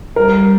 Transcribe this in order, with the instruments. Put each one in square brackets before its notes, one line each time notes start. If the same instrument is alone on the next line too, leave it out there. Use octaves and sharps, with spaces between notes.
[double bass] G3 [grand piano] A#4